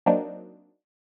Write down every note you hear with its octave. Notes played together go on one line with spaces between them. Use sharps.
F#3 A#3 C4 D4 D#4